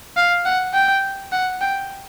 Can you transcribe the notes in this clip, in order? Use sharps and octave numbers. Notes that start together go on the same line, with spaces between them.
F5
F#5
G5
F#5
G5